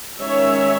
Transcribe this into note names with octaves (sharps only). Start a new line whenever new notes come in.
D#3 G#3 C#4 C#5 E5